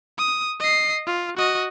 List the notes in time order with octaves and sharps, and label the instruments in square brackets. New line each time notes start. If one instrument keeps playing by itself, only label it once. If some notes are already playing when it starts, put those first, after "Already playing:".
[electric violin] D#6
D#5 C7
F4
F#4 D#5